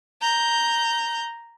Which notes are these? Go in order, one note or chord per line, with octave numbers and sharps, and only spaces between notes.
A#5 G6